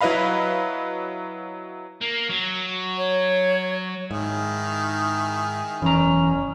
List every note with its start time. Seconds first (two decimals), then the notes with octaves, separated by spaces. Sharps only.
0.01 F#3 E4 B4 D#5 F5 B5
2.01 A#3
2.30 F#3
2.98 C#5
4.11 G#2 D#3 E4 G#4
5.82 E1 F#2 E3 C#4 A#5